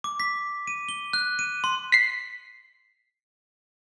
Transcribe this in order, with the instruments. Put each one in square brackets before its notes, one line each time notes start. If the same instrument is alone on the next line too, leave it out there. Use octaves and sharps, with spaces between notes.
[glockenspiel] D6
B6
D#7
G7
F#6
D#7
C6
[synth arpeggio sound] B6 C7